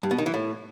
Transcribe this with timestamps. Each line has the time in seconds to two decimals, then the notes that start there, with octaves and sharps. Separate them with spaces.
0.03 G2
0.11 B2
0.18 D#3
0.26 E3
0.34 A2